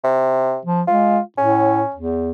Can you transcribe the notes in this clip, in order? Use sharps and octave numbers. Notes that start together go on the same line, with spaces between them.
C3
F3
G#3 F4
A2 C#4
E2